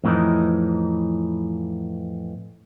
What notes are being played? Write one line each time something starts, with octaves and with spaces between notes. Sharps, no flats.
F2 A2 D#3 E3 D#4